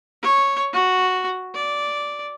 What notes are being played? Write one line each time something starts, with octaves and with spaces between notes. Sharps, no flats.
C#5
F#4
D5